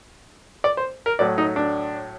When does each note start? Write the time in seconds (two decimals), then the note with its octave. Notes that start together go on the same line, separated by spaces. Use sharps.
0.64 D5
0.77 C5
1.06 A#4
1.19 A2 F#3 D5
1.38 D#4
1.56 D4